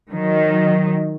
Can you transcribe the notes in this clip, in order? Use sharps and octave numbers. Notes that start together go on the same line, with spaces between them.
D#3 F#3